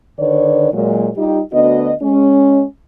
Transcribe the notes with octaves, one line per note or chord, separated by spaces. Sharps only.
D3 D#3 B4 C#5 D5
A#2 F#3 G#3
G3 D#4 F4 G4
D2 B3 D4 F#4 D#5
G#3 C#4